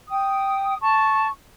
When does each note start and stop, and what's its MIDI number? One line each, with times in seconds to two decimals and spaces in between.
0.08 0.74 79
0.08 0.74 87
0.79 1.27 81
0.79 1.27 85